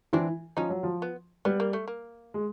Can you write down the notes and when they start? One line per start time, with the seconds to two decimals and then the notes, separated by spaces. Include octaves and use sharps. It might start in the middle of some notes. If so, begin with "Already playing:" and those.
0.13 E3 C4 D4
0.57 F3 C#4 D#4
0.70 F#3
0.83 F3
1.02 B3
1.45 G3 B3
1.60 A#3
1.73 A3
1.88 A#3
2.34 G#3